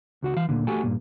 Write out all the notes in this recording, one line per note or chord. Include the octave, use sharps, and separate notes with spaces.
C#2 F#4 F#5
E3 F5
D2 G2 A#2 D3
A3 F#4 G4 A4 F#5 G#5
G2 A#2